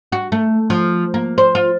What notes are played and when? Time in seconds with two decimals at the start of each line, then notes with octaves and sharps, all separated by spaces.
0.12 F#4
0.32 A3
0.70 F3
1.14 A#3
1.38 C5
1.55 F4